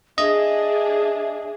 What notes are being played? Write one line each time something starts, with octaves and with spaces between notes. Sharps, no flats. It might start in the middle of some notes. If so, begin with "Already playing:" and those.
D4 G#4 D#5 E5